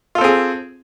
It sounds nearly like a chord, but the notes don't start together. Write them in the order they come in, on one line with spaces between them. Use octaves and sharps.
F4 A4 C4 G#4